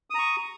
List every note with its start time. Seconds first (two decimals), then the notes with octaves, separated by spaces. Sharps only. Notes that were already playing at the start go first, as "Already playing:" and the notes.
0.10 D#6
0.14 A#5
0.19 C#6